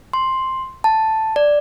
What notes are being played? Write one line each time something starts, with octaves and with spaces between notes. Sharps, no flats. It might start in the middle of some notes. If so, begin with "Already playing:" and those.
C6
A5
D5